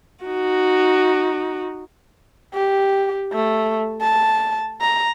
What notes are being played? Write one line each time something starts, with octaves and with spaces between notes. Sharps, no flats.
D#4 F#4
G4
A3
A5
A#5